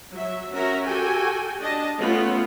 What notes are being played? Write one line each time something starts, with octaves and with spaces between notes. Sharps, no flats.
F#3 E5
C#4 F#4 A#4 E5 A#5
F#4 G4 A4 G5 G#5
D4 D#5 A5
A3 B3 C#4 F4